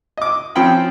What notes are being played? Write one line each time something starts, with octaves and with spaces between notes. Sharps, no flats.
D#5 D6
F3 C4 C#4 G5 B5